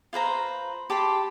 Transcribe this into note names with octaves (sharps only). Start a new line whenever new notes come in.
F4 B4 C5 A#5
G4 A5 B5 C6